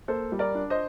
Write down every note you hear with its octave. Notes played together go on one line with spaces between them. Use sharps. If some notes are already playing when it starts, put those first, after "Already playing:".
A#3 A4 C5
G3
A#4 D5
D4
C5 D#5